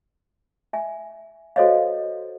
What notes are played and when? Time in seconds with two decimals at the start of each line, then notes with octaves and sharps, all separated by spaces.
0.73 E5 G#5
1.56 F#4 A4 C5 C#5 D#5 F5